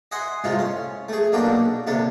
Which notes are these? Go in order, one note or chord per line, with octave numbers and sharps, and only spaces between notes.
D#5 E5 F#5 G#5 C6
C2 A2 C3 G#3 F4
C#4
A3 G#4
B1 A#3 D4 F#4 G5
D#2 C3 D4 A4